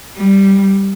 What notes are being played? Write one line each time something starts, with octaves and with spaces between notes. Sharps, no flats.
G3